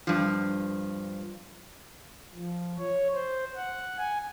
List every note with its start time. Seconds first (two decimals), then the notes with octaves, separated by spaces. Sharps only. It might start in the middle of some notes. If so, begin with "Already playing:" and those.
0.07 G2 F3
2.35 F3
2.79 C#5
3.13 C5
3.56 F#5
3.98 G#5